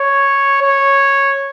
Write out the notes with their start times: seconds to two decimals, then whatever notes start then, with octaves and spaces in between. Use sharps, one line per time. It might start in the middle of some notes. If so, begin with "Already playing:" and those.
Already playing: C#5
0.62 C#5